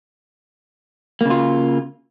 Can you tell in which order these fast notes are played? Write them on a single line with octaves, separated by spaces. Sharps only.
A#3 C#3 F4